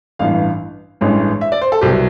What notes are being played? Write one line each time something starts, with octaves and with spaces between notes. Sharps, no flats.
A1 G2 E3 F5
A1 G2 E3 G#3 C#4
E5
D5
C5
A4
C2 B2 F#3 G4